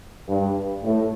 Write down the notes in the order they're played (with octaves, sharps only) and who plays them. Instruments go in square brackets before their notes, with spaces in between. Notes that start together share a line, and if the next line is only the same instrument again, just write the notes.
[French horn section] G2
A2